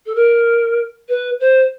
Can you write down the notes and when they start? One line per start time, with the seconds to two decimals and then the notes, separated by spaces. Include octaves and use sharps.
0.06 A4
0.15 A#4
1.09 B4
1.40 C5